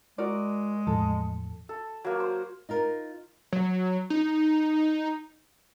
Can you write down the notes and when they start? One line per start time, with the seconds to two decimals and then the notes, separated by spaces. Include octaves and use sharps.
0.18 G#3 F#4 A#4 D5
0.87 E2 A2 F3 A4
1.69 A4
2.05 F#3 A#3
2.20 C5
2.69 D#4 F4 A#4
3.52 F#3
4.10 D#4